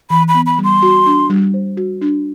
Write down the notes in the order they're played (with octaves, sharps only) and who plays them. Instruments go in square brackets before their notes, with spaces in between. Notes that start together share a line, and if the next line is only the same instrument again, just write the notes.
[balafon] E3 [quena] B5
[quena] B5
[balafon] B3
[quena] B5
[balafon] G3
[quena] C6
[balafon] F#4
D4
G3
C5
F#4
D4